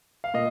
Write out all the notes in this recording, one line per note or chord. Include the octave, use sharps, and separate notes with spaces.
F5
A#2 D#5